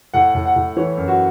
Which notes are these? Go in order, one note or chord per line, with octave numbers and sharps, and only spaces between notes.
A2 F#5
A2
F#5
A2
E3 C#5
F#2
F#4